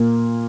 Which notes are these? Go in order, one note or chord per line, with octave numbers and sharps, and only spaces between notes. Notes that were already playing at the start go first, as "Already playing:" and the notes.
Already playing: A#2 A#3